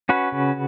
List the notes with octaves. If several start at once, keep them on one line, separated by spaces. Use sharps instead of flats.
C#4 F#4 B4
C#3